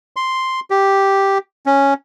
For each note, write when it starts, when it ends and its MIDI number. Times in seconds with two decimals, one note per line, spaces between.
0.16 0.60 84
0.71 1.38 67
1.66 1.94 61